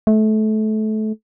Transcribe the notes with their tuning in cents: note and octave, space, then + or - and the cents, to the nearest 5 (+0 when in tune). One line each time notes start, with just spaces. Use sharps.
A3 -25